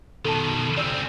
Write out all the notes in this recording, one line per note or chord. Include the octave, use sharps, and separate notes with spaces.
B2 D#3 A4 A5
C#3 C4 D5 E6